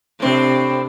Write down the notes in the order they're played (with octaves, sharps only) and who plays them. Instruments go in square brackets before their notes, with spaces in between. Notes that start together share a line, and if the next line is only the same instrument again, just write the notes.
[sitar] A2 C4 [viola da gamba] C3 D4